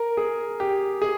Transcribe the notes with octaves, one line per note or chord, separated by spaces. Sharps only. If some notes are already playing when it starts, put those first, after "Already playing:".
Already playing: A#4
G#4
G4
G#4